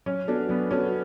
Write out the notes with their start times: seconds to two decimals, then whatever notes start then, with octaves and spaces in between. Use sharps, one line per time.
0.06 F#3 C#4
0.28 B3 D4 F#4 A4
0.49 F#3 B3
0.71 B3 C#4 F#4 A4